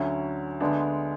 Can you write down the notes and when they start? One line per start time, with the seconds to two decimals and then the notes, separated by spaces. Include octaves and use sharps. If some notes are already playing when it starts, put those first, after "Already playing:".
Already playing: D2 D3 F#3 C#4
0.60 D2 D3 G#3 B3 D4